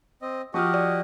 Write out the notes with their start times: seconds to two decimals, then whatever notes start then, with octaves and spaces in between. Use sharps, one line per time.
0.22 C4 D#5
0.54 F3 F#4 G4 D#5 C#6 D#6 F6
0.74 D5